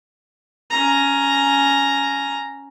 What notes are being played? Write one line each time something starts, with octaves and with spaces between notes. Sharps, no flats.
C#4 A#5